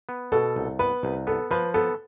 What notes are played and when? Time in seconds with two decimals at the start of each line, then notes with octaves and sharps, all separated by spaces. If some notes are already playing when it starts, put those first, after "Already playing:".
0.09 B3
0.32 B2 A4
0.56 C2
0.79 B3 B4
1.03 C2
1.27 B3 A4
1.51 F3 B4
1.74 B3 A4